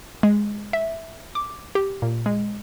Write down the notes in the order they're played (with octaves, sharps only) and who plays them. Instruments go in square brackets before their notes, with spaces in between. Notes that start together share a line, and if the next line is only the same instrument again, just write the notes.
[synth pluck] G#3
E5
D6
G4
A#2
G#3